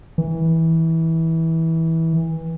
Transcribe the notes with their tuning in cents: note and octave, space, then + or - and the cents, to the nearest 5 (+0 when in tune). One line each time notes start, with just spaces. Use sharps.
E3 -20